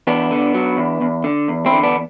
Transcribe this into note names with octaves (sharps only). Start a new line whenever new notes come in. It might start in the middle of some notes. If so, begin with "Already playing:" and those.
E2 B3 D4
D3
F#3
E2
E2
D3
E2
C4 E4
D3
B3 D4